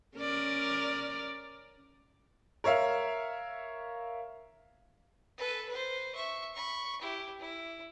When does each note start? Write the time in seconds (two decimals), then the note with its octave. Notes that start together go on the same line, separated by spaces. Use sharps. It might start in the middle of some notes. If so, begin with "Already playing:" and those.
0.18 C#4 A#4 D5
2.64 A#4 C#5 E5 F5
5.38 A4 B4
5.69 B4 C5
6.15 E5 C#6
6.54 B5 C#6
7.01 E4 G4
7.40 E4